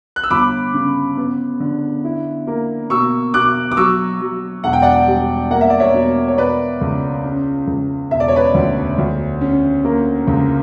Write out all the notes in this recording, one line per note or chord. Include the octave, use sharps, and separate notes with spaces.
F#6
E6
G1 B5 D6
C#3
B3
D3
E4
A#3
B2 C#6 E6
B2 D6 F#6
D6
F#3 C#6 E6
F#3
E1 F#5
G5
D5 F#5
G3
A#3 F#5
E5
D5
C#5 E5
B2
C#5
B2 B4 D5
C#2
C#4
C#2
E1 E5
D5
C#5
B4 D5
D2
D2
C#4
A#3
C#2